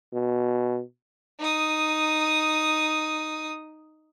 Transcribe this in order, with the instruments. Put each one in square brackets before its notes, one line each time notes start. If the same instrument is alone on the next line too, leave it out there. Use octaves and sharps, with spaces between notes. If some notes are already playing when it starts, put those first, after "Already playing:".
[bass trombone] B2
[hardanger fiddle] D#4 D#6